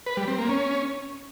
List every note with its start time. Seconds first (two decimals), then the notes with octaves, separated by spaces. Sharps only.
0.06 B4
0.17 G3
0.28 C4
0.38 A#3
0.49 C#4